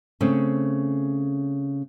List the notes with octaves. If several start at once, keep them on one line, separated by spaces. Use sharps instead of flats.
C#3 A3 C4 C#4